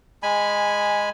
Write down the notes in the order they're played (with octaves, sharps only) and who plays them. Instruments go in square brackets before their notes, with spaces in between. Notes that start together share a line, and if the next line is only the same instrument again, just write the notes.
[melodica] G#3 G#5 B5